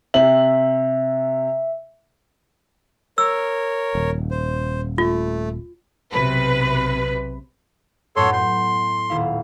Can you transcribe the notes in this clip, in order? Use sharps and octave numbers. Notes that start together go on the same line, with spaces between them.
C3 E5 F#7
A#4 C#5 E6
D#1
C5
A3 F4
B1 C3 B4
F#2 A2 B3 A4 C#5 C6
C6 G6
D#1 E4 F5